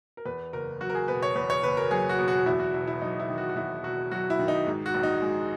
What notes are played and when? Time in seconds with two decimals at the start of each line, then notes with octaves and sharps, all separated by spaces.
0.17 A#4
0.25 E2 B4
0.53 F#1 A#4
0.81 F#3 F#4
0.90 A#4
0.95 G#4
1.08 B2 B4
1.23 C#5
1.36 E2 B4
1.50 C#5
1.63 F#1 B4
1.77 A#4
1.91 F#3 G#4
2.09 F#4
2.18 B2
2.28 F#4
2.46 E2 E4
2.60 F#4
2.74 E1 E4
2.87 E4
3.02 F#3 D#4
3.19 E4
3.29 D#3
3.38 F#4
3.49 F#4
3.56 E2 E4
3.84 E1 F#4
4.11 F#3 F#4
4.30 E4
4.39 D#3
4.48 D#4
4.67 G#2
4.86 F#4
4.94 A#1
5.03 D#4
5.22 G#3